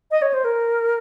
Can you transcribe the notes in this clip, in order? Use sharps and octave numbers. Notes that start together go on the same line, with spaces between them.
D#5
C#5
C5
A#4